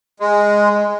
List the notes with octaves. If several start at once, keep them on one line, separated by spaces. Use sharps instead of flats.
G#3